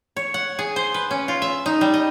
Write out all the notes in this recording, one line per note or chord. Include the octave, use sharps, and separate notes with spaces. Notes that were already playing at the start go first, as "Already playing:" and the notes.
C#5
F#5
G#4
C5
B4
C#4
F4
E5
D#4
G3
D#5